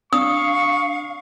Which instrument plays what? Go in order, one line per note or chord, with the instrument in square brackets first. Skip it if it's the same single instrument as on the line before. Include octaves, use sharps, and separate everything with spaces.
[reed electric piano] D4 [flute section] F5 [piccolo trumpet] C#6 [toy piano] D#6